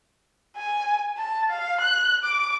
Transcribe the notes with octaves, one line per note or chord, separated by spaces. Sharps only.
G#5
A5
F5
F#6
D6